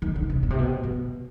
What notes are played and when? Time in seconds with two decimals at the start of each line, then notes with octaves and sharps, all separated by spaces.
0.02 D#3
0.16 D3
0.30 C3
0.43 B2
0.50 C3
0.59 B2
0.83 B2